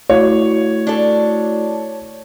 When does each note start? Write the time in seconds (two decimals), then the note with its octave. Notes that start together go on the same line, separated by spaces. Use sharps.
0.10 A3 E4 F#4 C#5
0.87 D4 A4